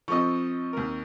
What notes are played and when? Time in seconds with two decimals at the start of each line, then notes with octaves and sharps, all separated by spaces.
0.08 F3 C4 A4 D#5 C#6
0.73 D#2 A#4